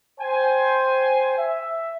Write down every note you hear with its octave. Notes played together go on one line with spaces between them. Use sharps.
C5 G5 G#5
E5